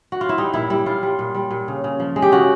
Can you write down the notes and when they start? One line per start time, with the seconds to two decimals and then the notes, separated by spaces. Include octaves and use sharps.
0.12 F#4
0.21 F4
0.29 E4
0.38 G3 D#4
0.54 A#2 E4
0.70 G3 E4
0.86 A#2 F4
1.03 G3
1.19 A#2
1.35 G3
1.51 A#2
1.68 C#3
1.84 C#3
2.00 F3
2.16 G#3
2.22 G4
2.32 C#3 F#4